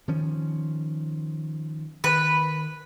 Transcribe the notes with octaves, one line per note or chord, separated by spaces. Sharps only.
D#3 F3 C#4
D#3 B4